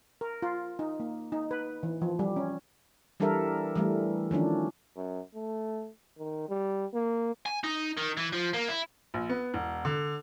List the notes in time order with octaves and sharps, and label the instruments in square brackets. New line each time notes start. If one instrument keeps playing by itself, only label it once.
[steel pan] A#4
F4
D#4
A#3
D#4
B4
E3
F3
G3
C#4
[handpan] E3 G3 D4 A4 A#4 E5
E3 G3 A3
D#3 F3 C#4 D4
[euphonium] F#2
A3
D#3
G3
A#3
[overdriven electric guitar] G#5
D#4
D#3
E3
F3
A#3
E4
[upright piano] A#1
B3
E1
D3